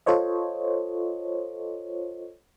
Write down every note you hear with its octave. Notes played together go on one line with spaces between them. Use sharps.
F4 A4 C5 C#5 D#5